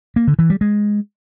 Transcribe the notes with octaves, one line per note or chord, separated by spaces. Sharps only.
A#3
D3
E3
G3
G#3